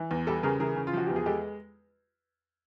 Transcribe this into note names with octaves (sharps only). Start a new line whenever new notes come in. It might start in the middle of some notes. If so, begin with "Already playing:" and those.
Already playing: E3
E2
G3 G4 A4
C#3 G#4 A#4
E3 G#4 A#4
C#3
F4
F3 F#4
E2 G4
G#4
G#3 G4 A4